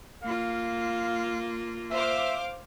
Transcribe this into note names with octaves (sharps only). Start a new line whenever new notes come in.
A#3 F4 F5
C5 E5 F5 D6